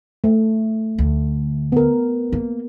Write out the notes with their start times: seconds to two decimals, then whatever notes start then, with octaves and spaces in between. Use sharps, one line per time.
0.24 A3
0.98 D2
1.72 B3 A#4
2.32 A#3